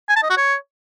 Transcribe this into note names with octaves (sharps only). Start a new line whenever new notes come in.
G#5
A5
D#5
F#4
C#5